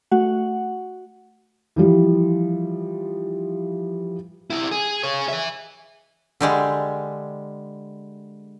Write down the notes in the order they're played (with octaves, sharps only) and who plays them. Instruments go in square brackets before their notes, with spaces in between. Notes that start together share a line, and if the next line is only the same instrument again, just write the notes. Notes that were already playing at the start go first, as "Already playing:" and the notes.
[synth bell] A3 F#4 F#5
[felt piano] E3 F3 G3
[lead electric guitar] C4 E4
G#4
G#4 C#5
B4 E5
[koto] D3 G3 G#3